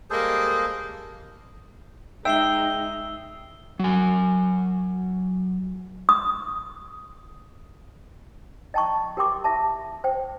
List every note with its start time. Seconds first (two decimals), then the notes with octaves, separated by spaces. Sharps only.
0.10 G3 G#3 A#3 G#4 A4 C5
2.25 G#3 D#4 E5 G5 E6 C7 G7
3.79 F#3 G#5
6.09 D#6
8.74 D#5 G5 A5 A#5 C#6
9.17 G4 A#4 G5 C6 D6
9.44 G4 E5 A5
10.04 C5 G5